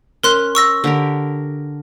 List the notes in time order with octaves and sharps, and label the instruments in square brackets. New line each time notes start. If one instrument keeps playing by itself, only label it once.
[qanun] C#4 [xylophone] A#4 C6 F#6
[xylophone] C#6 E6 A#6
[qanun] D3 G4 A#4